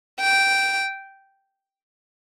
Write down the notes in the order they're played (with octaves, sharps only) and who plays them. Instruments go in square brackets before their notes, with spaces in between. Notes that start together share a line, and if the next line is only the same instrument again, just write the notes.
[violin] G5